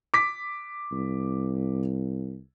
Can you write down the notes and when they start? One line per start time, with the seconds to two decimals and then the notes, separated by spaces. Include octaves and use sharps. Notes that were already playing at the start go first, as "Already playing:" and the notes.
0.14 D6 B6
0.92 C2